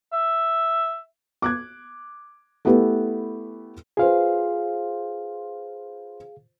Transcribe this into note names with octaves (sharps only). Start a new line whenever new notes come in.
E5
D6 F#6 G#6
A3 B3 E4 G4 B4
F4 G#4 B4 C5 F5